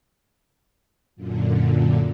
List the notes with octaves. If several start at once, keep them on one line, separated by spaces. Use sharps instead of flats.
F#2 A#2 D3